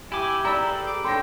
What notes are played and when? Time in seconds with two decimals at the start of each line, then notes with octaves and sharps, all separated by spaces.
0.12 E4 G4 G#5 D6
0.45 E4 D5 A#5 E6
0.61 G#4 A4 B4
0.87 D6
1.05 C#4 D4 A4 G5 C6 A#6